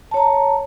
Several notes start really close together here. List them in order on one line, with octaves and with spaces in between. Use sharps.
A5 C#5 A#5